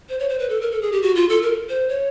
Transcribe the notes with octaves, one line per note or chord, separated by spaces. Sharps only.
C5
C#5
C5
B4
A4
A#4
A4
G#4
G4
F#4
F4
A4
A#4
C5
C#5